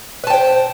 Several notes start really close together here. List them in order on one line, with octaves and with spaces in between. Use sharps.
B4 A5 G5 C5